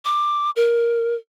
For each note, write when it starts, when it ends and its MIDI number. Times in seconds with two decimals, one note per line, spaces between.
0.05 0.50 86
0.56 1.15 70